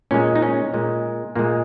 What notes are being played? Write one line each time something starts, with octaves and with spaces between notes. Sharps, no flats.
A#2 G#3 C#4
D#4
C#4
A#2 G#3
A#2 G#3 A#3